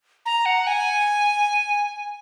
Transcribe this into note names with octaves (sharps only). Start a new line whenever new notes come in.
A#5
F#5
G#5